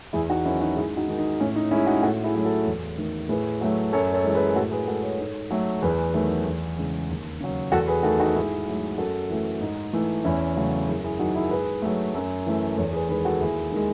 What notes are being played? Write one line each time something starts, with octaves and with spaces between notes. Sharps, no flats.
E2 E4 G#4
D#4 F#4
D#3 F#3 C#4 E4
D#4 F#4
G#2 E4 G#4
D#4 F#4
D#3 G#3
D#4
A2 C#4
D#4
G#3 C#4 E4
D#4 F#4
A2 F#4 A4
E4 G#4
F#3 A3
F#4 A4
E2
D#3 A3
A2 G#4 B4
F#3 A3
F#2 A4 C#5
A4 C#5
E3 G#3
G#4 B4
A2 F#4 A4
G#4 B4
G#3 F#4 A4
A4 C#5
G#2
F#3 A3
E2 G#4 B4
D#3 F#3 A3
E2
C#3 E3 G#3
D#2
C#3 F#3
E2 F#4 A4
G#4 B4
D#3 A3 F#4 A4
D#4 F#4
G#2 E4 G#4
F#3 A3
F#2 F#4 A4
E3 A3
G#2 D#4
E3 A3
E2 C#4 E4
C#3 F#3 A3
F#2 E4 G#4
E4 G#4
D#3 F#3 D#4 F#4
E4 G#4
G#2 G#4 B4
F#3 A3
F#2
E3 A3
E2 A4 C#5
G#4 B4
D#3 G#3 G#4 B4
F#4 A4
D#2 E4 G#4
D#3 G#3